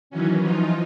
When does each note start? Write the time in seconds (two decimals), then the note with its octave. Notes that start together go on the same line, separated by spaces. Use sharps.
0.10 D#3 E3 F#3 C#4
0.41 E3 F3 D#4 F4